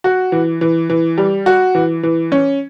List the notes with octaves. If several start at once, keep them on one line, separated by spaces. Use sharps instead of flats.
F#4
E3
E3
E3
G3
F#4
E3
E3
C#4